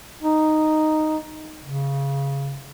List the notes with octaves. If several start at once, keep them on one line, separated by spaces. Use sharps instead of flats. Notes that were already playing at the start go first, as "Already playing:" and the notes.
D#4
C#3